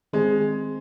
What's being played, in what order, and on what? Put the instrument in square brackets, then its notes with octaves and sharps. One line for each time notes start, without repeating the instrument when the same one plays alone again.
[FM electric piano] D#3 C4 G#4 [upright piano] G#3